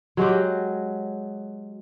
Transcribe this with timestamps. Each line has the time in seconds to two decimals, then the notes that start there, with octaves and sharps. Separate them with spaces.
0.17 F#3 G#3 F#4 G4